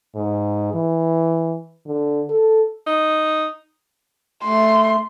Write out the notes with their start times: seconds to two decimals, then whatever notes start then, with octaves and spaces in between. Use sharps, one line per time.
0.15 G#2
0.73 E3
1.86 D3
2.30 A4
2.87 D#4
4.44 A3 C6